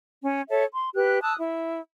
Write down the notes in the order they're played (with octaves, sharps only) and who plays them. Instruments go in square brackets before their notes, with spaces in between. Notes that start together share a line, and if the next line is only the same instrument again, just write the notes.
[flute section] C#4
A4 C#5 E5
C6
G4 B4 F#6
A5 D#6 E6 F#6
E4